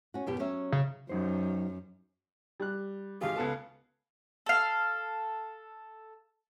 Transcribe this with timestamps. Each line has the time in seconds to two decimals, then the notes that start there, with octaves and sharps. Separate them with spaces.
0.14 C#4 F#4
0.27 F#2 B2 G4
0.39 F#3 C#4 E5
0.72 C#3
1.09 F#2 F#3 D#4 C5
2.60 G3 F#6
3.21 G#1 G4 G#4 F5
3.36 C#2 B3 A4 A5
4.46 A4 F5